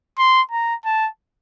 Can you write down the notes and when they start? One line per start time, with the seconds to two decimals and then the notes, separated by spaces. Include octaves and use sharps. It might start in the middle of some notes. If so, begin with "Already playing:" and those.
0.18 C6
0.52 A#5
0.85 A5